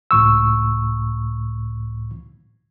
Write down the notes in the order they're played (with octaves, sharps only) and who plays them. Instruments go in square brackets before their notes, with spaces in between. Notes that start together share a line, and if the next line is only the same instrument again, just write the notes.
[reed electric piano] C#2 A2 C#6 E6